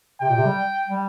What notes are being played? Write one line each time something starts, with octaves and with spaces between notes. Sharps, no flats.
C3 G5
A#2
C3
G3
G3